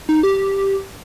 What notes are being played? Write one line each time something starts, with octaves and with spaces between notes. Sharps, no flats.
D#4
G4